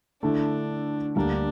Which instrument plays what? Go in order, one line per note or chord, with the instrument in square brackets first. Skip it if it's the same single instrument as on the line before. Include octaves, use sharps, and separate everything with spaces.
[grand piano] D3 A3 E4 [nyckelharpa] D4
[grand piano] D2 D3 G3 A#3 [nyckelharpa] D4